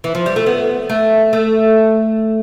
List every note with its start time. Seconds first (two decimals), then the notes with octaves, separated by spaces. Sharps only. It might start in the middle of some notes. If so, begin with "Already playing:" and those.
0.04 E3
0.15 F3
0.26 G3
0.36 A3
0.46 B3
0.90 A3
1.33 A3